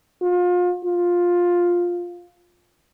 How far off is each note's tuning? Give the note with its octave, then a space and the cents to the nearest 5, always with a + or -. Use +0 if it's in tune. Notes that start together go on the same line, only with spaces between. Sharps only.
F4 +35
F4 +10